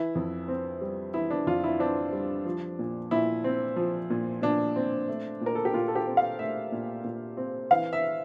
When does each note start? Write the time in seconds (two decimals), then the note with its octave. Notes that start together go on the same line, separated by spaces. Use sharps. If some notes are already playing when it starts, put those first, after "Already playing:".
Already playing: E3 E4
0.15 F2
0.48 C4
0.81 G3
1.14 E3 E4
1.31 D4
1.47 F2 F4
1.64 E4
1.79 C4 D4
2.13 G3
2.45 F3
2.79 A#2
3.11 A#2 E4
3.44 C4
3.76 F3
4.10 A#2
4.42 A#2 D4
4.76 C4
5.08 A3
5.41 A#2
5.46 A#4
5.55 A4
5.65 G4
5.74 A#2 F4
5.88 A4
5.95 G4
6.06 C4
6.17 F5
6.39 A3 E5
6.72 A#2
7.04 A#2
7.37 C4
7.71 E3 F5
7.93 E5